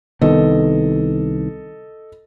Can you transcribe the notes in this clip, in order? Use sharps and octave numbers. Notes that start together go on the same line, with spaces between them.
C2 D#3 B3 A4 D#5